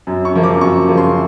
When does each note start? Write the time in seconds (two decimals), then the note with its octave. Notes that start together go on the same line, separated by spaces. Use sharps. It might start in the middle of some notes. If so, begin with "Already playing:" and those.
0.07 F#2
0.25 C#6
0.34 C#3 F3 A#3
0.43 D6
0.61 F#2 C#6
0.88 C#3 F3 A#3
0.97 C6